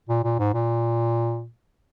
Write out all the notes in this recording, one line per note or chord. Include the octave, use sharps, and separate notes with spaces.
A#2
A#2
G#2
A#2